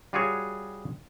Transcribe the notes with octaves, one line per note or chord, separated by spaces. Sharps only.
G3 F4 F#4 G#4 C#5